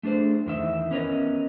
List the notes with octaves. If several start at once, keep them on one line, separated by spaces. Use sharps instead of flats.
A3 D4 G#4 C5
E2 D#3 E5
B3 C#4 A#4 B4 C#5 D#5